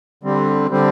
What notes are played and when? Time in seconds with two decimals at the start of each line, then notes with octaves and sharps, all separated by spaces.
0.23 D3 G3 C4
0.70 D3 G3 C4